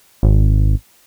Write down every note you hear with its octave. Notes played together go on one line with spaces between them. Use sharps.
G#1